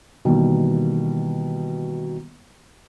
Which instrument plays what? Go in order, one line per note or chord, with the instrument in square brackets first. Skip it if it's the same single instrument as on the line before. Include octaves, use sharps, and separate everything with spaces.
[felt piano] B2 D#3 E3 G3 A#3